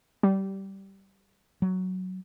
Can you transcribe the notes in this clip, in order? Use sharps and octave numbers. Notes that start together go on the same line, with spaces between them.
G3
F#3